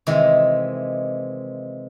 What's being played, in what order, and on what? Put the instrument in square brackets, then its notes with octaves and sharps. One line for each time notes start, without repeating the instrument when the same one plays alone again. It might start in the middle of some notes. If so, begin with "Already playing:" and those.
[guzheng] C3 D#3 E3 G#3